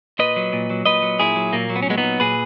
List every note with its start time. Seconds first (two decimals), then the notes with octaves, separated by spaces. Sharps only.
0.19 A#2 B4 D#5
0.36 F#3
0.53 A#2
0.70 F#3
0.86 A#2 B4 D#5
1.02 F#3
1.20 A#2 E4 G#4
1.36 F#3
1.53 A#2 A#3
1.70 F#3
1.76 B3
1.83 C#4
1.86 A#2 G#3 B3
1.98 B3 D#4
2.03 F#3
2.20 A#2 G#4 B4